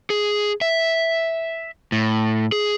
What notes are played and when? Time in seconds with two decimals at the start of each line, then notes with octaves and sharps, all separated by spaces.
0.10 G#4
0.61 E5
1.92 A2
2.52 G#4